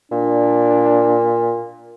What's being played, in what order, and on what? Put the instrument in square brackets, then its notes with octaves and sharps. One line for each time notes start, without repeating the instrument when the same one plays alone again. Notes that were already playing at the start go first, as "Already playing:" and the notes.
[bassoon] A#2 [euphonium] D4